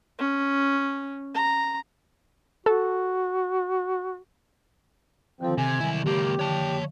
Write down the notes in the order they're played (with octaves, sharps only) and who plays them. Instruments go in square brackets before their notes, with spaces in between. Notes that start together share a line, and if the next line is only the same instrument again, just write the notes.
[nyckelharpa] C#4
A#5
[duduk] F#4 [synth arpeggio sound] A4
[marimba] D3 D#3 A4 [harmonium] F3 C4
[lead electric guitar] C3 [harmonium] G#5
[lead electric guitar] C2 E4 [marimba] D#3 F#3
[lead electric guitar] C#2 A#3 [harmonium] G4 [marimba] C#5 A5
[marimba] D3 E3 F3 [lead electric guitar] C#5 A5